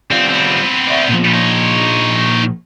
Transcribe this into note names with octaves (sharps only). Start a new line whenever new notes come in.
G3 C4 F4
B3 C4
D5 E5
A#2 F3
D#4 C#5